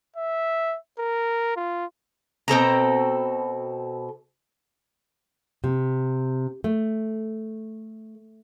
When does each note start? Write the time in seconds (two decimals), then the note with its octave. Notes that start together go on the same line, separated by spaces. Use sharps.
0.16 E5
0.99 A#4
1.56 F4
2.48 B2 C4 A4 A#5
5.64 C3
6.64 A3